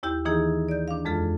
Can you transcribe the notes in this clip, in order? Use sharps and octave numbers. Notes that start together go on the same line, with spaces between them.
D#2 E4 G4 G6
D#3 E3 A#3 D#4 E4 G#4
D5 G6
D4 F5
F2 G#3 A4 F6